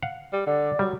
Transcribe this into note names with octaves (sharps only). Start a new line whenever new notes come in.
F5 F#5
G3
D3 D5
F#3 G3